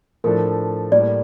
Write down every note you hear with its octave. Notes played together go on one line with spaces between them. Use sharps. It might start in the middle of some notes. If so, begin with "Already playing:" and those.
A2 F3 A3 D4 A4 A#4
A2 G3 A#3 D5